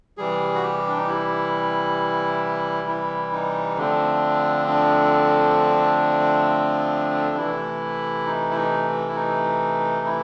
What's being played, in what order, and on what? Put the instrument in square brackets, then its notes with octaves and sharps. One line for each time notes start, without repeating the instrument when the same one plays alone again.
[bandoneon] C3 E3 G3 G#4
F#4
G4
D4
D#4
E4
E4
D#4
D3 F3 A3 C4 D4
D4
C3 E3 A3 E4
D#4
E4
D#4
E4
D#4
E4